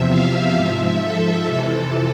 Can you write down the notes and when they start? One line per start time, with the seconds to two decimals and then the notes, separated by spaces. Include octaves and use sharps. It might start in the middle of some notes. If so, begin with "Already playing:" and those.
Already playing: E2 C3 F3 E5
0.10 F5
0.55 G#2 F3 E5
1.02 A4
1.48 F2 C3 E3